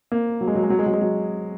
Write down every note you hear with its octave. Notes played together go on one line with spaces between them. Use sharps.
A#3
F#3
G#3
F#3
G#3
F#3
G#3
F#3
G#3
F#3